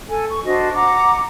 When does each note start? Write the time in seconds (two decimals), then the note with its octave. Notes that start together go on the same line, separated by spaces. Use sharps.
0.09 A4 G#5
0.30 C#6
0.45 D4 F#4 C5 D#5
0.73 F#5 A#5 D6